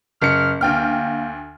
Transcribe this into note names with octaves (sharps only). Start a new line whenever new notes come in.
F#1 F6 C#7
D2 A#3 G5 F6